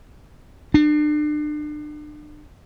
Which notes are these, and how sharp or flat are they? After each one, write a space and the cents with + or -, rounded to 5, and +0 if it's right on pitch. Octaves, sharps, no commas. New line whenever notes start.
D4 +35